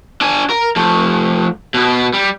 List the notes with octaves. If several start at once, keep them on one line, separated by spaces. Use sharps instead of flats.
D4 G#5
A#4
F3 A3
B2 B3
G3